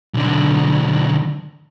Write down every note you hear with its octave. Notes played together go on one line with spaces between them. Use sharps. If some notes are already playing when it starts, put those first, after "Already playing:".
B1 D3